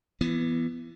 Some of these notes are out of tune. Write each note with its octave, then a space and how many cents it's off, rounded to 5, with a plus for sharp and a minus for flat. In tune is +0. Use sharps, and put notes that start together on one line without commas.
E3 +25 B3 +0